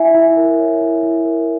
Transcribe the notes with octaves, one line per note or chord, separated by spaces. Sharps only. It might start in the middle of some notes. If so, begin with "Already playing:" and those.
Already playing: E4 E5 G#5
E4
A#4
C#5
E4
E4
A#4